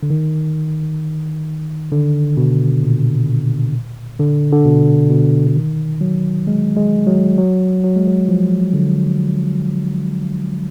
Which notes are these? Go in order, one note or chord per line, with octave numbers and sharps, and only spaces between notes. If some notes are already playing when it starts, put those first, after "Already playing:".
D3
D#3
D3
B2
A#2
D3
D3
B2
B2
D3
D#3
F#3
G#3
G#3
F#3
F#3
F#3
G#3
F#3
F3
D3